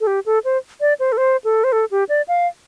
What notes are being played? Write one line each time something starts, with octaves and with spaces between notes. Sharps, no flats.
A4
G4
A4
C5
D5
C5
A4
C5
A4
C5
A4
G4
D5
F5